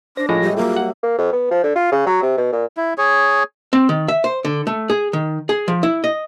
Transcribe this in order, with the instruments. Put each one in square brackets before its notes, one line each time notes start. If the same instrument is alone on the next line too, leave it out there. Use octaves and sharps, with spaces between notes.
[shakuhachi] D4 [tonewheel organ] C5 A#6
[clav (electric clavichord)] A2 G#3 [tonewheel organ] F3 F4 A#6
[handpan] G3 G4 E5 [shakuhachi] D#5
[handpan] F#3 E5 [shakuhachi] A#3 [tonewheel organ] F4 G#4
[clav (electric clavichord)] F#5
[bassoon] A#3
F2
B3
F3
D3
F4
C#3
F#3
C3
B2
A#2
[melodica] E4
G#4 C#5
[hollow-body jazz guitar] C4
D#3
E5
C5
D3
A3
G#4
D#3
G#4
F3
E4
D#5